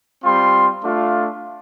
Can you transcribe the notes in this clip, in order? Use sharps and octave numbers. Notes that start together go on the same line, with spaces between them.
G3 C4 F4 C6
A3 D4 F4